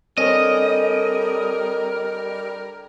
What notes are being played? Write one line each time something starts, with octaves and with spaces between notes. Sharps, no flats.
D3 G3 C4 G#4 A#4 C#5 D#5